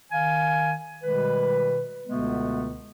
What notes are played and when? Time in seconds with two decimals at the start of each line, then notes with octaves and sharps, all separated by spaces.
0.11 D#3 F5 G#5
1.03 B2 D#3 G3 G#3 B4
2.07 C#2 B2 D3 G#3 A3 B3